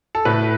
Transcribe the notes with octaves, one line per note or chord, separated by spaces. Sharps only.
A4
A2 B4